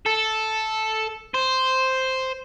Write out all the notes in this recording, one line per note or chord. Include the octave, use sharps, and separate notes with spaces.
A4
C5